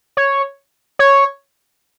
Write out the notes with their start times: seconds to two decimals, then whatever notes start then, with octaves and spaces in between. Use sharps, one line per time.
0.17 C#5
0.99 C#5